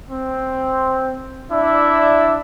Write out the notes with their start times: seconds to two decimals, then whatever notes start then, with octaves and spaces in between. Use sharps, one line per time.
0.10 C4
1.50 D4 E4 D5 E5